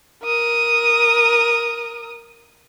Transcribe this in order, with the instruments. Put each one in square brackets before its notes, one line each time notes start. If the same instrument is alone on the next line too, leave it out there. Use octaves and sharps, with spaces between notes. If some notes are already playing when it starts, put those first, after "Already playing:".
[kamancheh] A#4 D#6